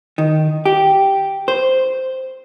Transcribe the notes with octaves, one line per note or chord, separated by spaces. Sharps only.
D#3
G4
C5